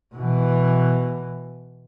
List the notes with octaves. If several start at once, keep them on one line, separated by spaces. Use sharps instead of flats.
B2 E3